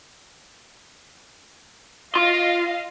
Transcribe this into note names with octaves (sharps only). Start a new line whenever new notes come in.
F4 D#5 F5 C6